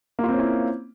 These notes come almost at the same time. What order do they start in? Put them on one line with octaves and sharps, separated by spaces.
A#3 F4 C4 C#4 E4